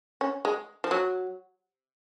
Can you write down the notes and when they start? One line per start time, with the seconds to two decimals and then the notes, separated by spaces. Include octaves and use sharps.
0.21 C#4
0.45 G#3
0.84 F3
0.91 F#3